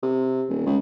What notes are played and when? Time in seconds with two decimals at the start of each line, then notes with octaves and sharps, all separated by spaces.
0.03 C3
0.49 D#1
0.66 C#2